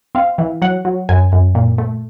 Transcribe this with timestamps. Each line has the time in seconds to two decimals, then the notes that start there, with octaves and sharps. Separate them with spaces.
0.15 C4 F5
0.38 E3
0.62 F#3 F#5
0.85 F#3
1.09 F#2 G#5
1.32 F#2
1.55 A#2
1.78 A3